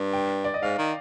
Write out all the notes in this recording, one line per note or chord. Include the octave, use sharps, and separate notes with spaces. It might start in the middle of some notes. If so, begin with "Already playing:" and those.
Already playing: G2
G5
D5
D#5
G#2 F5
D#3